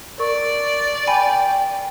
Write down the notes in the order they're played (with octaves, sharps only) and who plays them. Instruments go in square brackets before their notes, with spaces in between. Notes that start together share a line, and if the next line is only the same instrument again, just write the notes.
[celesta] A#4 C#6 [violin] D5
[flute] G5 [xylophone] G#5 B5